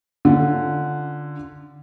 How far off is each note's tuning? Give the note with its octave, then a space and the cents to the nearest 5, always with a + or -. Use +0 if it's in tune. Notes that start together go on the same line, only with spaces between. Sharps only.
D3 +0 C#4 +0 F4 +0